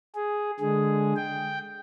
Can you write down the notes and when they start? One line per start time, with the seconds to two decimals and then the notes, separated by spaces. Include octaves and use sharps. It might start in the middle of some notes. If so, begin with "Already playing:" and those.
0.15 G#4
0.60 D3 G#3 G#4
1.16 G5